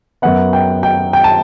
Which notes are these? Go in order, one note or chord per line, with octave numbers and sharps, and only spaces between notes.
F#2 F#3 B3 F#5
G5
G5
G5
A5